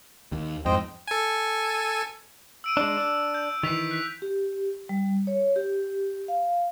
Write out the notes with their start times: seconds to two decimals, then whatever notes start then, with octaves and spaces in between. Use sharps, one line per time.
0.32 D#2
0.66 F2 G#2 C5 D#5 G5
1.08 A4 G#5
2.64 E6 D7 D#7
2.77 G#3 D4
2.97 D4
3.34 G6
3.63 D#3 E3 B6 F7
3.91 F#6 B6
4.22 G4
4.89 G3
5.27 C#5
5.56 G4
6.28 F5